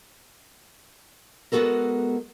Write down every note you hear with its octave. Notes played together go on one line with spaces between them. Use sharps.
G#3 B3 C#4 F#4 A4 A#4